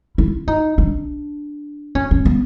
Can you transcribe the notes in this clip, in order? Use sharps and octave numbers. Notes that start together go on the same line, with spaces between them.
E4
D#4
D4
C#4
C#4
B3